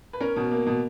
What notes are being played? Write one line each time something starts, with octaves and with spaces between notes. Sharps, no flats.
B4
C#4 A#4
B2
A#3
B2